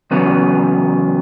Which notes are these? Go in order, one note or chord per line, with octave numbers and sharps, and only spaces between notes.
E2 C#3 F#3 B3